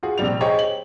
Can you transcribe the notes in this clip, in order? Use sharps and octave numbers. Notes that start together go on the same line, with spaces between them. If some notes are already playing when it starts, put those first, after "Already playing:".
F4 F#4 G#4
A#1 C3 G3 F7
D#4 G4 G#4 C5 C#5 D#5
F#7